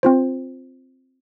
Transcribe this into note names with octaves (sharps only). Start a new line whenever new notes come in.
C4 F4 C5